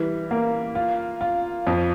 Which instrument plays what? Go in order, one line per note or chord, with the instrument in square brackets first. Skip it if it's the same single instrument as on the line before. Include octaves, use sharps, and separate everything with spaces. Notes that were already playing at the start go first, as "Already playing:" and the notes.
Already playing: [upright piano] E3 G3
A#3
F4
F4
F2